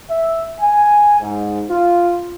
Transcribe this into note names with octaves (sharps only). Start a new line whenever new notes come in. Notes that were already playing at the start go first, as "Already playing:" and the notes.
E5
G#5
G#2
F4